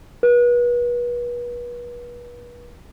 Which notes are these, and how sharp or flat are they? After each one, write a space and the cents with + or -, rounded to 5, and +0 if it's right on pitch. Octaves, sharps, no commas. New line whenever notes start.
B4 -35